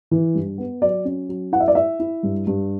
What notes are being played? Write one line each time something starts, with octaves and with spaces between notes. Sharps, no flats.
E3
G2
B3
F#3 D5
C#4
F#3
E4 F#5
E5
D5
E4 E5
E4
G2
G2